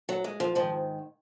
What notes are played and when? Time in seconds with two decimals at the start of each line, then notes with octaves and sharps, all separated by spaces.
0.09 F#3
0.24 G#3
0.40 F3
0.55 G#2 D#3 F3